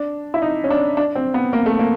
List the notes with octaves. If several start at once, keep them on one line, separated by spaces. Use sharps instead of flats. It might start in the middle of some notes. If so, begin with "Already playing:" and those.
Already playing: D4
E4
D#4
C#4
D4
D4
C4
B3
A#3
A3
A#3